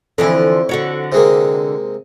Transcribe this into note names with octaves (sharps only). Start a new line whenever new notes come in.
F2 D3 E3 F3 E4
D3 F#4 C#5
C3 G#3 A#3